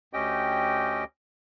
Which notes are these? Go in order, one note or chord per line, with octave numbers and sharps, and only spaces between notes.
D2 C#4 G4 D#5 G5